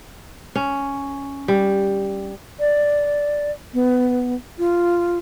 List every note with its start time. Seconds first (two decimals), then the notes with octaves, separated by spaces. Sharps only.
0.55 C#4
1.48 G3
2.60 D5
3.74 B3
4.58 F4